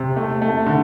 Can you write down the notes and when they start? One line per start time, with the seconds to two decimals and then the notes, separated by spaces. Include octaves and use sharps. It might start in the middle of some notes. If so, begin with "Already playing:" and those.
Already playing: C3
0.16 A3
0.42 A3
0.66 D3